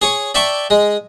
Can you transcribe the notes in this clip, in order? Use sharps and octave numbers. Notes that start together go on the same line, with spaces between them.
G#4 C#5 C#6
D5 E5 G5 A5 C#6
G#3